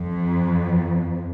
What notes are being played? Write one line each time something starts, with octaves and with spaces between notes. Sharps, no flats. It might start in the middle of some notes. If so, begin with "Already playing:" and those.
Already playing: F2